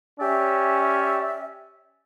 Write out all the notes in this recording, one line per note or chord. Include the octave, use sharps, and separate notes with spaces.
C#4 G4 D5 E5